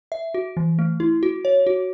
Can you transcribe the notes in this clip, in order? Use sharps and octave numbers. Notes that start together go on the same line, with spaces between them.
E5
F#4
E3
A3
E4
F#4
C#5
F#4